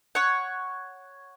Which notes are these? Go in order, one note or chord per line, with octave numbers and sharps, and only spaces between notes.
C#5 F#5